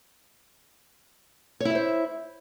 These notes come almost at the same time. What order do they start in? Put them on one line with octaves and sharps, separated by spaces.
C#5 E4 E5 C5